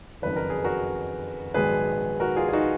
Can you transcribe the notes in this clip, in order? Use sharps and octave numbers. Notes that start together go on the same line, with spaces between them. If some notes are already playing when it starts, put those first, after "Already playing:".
F#1 F2 D#3 F#3 B4
A#4
G#4
F#4 A#4
A#1 G#2 D#3 F#3 B3 G#4 B4
F#4 A#4
F4 G#4
G#4
D#4 F#4